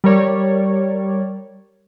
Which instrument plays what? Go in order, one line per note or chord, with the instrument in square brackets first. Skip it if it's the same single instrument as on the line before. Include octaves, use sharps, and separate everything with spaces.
[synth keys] G3 A#4 C#5 D5